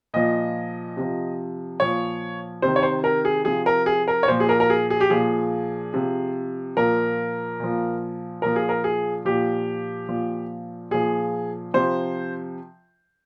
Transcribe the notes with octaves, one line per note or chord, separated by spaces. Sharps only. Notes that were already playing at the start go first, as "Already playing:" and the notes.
A#2 F3 D#5
C3 F3
A#2 F3 C#5
C3 D#3 C5
C#5
C5
A#4
G#4
C3 F3 G#4
A#4
G#4
A#4
C#5
A#2 F3 C5
G#4
A#4
A#4
G#4
G#4
G4
A#2 F3 G#4
C3 F3
A#2 F3 A#4
A#2 F3
A#2 F3 A#4
G#4
A#4
G#4
A#2 F3 G4
A#2 F3
A#2 F3 G#4
C3 F3 C5